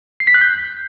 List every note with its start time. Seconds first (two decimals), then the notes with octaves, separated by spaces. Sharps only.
0.20 C7
0.27 B6
0.34 F#6
0.41 G6